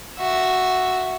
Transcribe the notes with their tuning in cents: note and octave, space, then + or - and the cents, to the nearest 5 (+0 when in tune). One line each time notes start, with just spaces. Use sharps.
F#4 +0 E5 +0